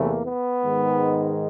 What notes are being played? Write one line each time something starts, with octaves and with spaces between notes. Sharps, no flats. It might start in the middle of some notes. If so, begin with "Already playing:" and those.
Already playing: E2 C3 E3 A3 A#3
B3
G#2 D#3 G#3